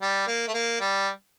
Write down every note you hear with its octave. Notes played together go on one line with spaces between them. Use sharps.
G3
A#3
A3
A#3
G3